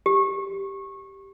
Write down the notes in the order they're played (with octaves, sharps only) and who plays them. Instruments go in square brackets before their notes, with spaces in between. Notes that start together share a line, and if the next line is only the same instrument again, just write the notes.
[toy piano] G4